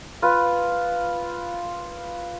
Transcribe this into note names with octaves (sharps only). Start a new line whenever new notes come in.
F4 B4